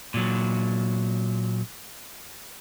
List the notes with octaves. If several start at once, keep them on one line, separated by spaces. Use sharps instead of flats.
A#2 F#3